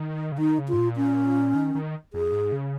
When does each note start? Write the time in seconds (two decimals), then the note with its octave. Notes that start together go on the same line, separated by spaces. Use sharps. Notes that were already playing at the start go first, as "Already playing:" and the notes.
Already playing: D#3
0.32 C#3
0.38 D#3 D#4
0.58 C#3
0.68 G#2 F4
0.78 A#2
0.96 C#4
1.55 D#3
1.75 D#3
2.13 F2 G#4
2.32 G#2
2.52 C#3